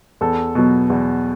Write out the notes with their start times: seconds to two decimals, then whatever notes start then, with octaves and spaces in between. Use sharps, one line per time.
0.21 E2 A4
0.55 B2 F#3
0.90 E2